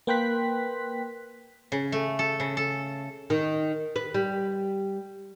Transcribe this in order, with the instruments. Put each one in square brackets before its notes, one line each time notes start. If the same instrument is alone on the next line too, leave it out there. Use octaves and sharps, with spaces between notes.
[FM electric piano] A#3 B4 G5 C6 F#6 B6
[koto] C#3
A3
A4
C#3
A4
[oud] D#3
B4
G3